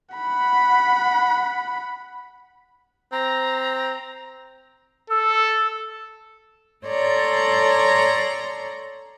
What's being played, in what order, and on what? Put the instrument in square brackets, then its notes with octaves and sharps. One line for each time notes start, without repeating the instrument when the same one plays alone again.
[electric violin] F#5 B5
[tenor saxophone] C4 [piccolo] A#5
[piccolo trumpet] A4 [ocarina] E6
[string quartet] A4 C#5 D5 A#5 C6